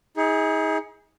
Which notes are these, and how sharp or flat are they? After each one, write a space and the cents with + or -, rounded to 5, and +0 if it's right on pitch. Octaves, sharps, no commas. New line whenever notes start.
D#4 +40 G#4 -10